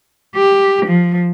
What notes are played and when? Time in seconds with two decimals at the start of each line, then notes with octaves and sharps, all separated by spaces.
0.36 G4
0.86 F3